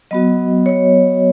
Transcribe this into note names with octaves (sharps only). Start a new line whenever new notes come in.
F#3 B3 F#4 D#5
C#5